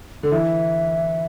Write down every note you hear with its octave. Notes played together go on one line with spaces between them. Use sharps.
D3
E3 E5